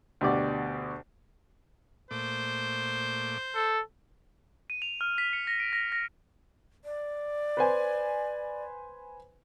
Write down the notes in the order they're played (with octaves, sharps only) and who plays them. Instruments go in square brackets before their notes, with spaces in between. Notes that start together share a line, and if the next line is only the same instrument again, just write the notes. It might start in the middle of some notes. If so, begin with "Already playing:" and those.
[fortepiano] D2 B2 G4 D5
[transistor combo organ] A#2 A3 D6 [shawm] C5
[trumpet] A4
[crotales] D#7
F7
F6
B6
C#7
A#6
D7
A#6
A#6
[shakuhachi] D5
[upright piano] B4 C5 G#5